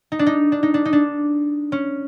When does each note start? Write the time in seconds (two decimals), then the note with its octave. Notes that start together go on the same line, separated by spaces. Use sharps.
0.12 D#4
0.19 D4
0.27 D#4
0.52 D4
0.63 D#4
0.74 D4
0.85 D#4
0.93 D4
1.72 C#4